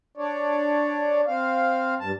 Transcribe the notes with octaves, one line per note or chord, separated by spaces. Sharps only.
D4 C#5 D5
C4 F5
G2 A5